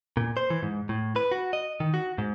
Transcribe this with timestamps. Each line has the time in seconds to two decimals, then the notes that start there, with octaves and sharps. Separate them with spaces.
0.17 A#2
0.37 C5
0.50 E3
0.63 G#2
0.89 A2
1.16 B4
1.31 F#4
1.53 D#5
1.80 D#3
1.94 F#4
2.18 G#2